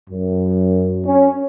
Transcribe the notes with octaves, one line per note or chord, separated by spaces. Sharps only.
F#2
C#4